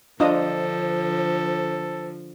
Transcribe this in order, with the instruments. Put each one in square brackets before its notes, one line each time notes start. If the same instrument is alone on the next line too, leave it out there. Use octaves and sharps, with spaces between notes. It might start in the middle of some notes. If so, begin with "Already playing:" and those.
[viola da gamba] D3 F3 [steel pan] D4 F4 D#5 [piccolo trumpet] A4 [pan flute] C5